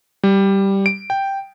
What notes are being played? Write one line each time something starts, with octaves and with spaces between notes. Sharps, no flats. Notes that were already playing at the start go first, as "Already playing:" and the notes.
G3
D7
G5